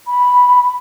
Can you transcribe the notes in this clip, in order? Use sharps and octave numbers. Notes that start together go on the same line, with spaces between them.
B5